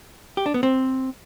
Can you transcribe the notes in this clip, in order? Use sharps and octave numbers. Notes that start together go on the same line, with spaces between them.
G4
D4
B3
C4